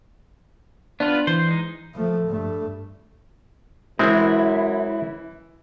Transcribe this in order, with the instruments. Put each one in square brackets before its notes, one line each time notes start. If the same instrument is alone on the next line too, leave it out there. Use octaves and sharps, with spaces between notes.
[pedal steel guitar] B3 F4 B4 [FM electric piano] D4
[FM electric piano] E3 [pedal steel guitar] C5
[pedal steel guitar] G#3 D#4
[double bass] F3 A3
G2 A3
[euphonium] F#2 [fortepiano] E3 [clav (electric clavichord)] G#3 C4 A#4 [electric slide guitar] E4